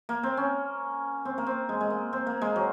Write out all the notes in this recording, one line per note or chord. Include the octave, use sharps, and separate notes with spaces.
A#3
C4
C#4
C4
A#3
C4
G#3
G#3
A#3
C4
A#3
G#3
F#3